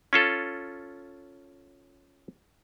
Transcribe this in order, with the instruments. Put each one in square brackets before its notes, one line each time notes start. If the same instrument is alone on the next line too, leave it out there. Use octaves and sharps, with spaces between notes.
[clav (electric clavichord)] C#4 F4 A4